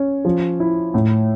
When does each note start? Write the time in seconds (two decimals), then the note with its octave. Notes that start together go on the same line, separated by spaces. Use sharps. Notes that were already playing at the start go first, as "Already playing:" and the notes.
Already playing: C#4
0.25 F3
0.60 E4
0.94 A2